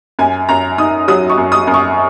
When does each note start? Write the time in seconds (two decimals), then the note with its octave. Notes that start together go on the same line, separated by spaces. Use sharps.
0.19 F#2 G#5
0.49 F#2 A#5
0.78 D#4 D#6
1.08 F#3 D#6
1.30 C#6
1.38 F#2
1.52 D#6
1.67 F#2
1.74 C#6